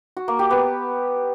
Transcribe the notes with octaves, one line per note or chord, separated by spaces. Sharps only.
F#4
A#3
G4
B3